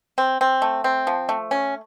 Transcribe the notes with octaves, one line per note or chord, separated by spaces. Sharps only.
C4
C4
A3
C4
F3
A3
C#4